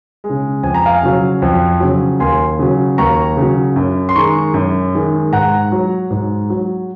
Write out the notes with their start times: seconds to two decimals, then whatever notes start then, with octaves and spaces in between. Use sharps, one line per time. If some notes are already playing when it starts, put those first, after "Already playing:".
0.24 G#3
0.30 C#3
0.63 F2 G#5
0.74 A#5
0.85 F5 G#5
1.03 C#3 F#3
1.42 F2
1.80 C#3 F#3
2.20 D#2 G#5 C6
2.59 C#3 F#3
2.98 D#2 A#5 C#6
3.37 C#3
3.42 F#3
3.76 F#2
4.09 C6
4.16 D#3 G#3 A#5 C#6
4.54 F#2
4.94 D#3 G#3
5.32 G#2 F#5 A#5
5.72 F#3
6.10 G#2
6.50 F#3